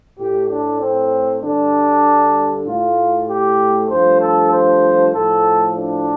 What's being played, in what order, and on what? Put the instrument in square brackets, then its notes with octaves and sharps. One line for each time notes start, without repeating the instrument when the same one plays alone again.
[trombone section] A2 A3 G4
D4
C4
G2 D3 G3 D4
A2 A3 F4
G4
G2 F3 A3 C5
A4
C5
A2 F3 A3 A4
D4